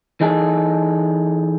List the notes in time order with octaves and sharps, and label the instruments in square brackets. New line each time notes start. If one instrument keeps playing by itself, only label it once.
[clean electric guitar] E3 D#4 G#4 A4